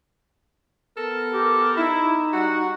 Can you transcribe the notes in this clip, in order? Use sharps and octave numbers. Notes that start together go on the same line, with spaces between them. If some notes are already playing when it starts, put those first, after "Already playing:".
B3 A4 A#4
G4
D#4 E4
G3 F#4 F#5